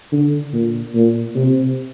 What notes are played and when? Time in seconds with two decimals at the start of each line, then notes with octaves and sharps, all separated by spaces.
0.12 D3
0.53 A#2
0.94 A#2
1.36 C3